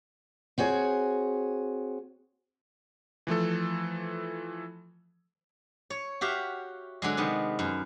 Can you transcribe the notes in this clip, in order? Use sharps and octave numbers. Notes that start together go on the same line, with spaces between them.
C4 F#4 G#4 C#5
E3 F3 A3 A4
C#5
F#4 G4 E5 F5
D3 F#3 G#3
C3 D#3 B3
F#2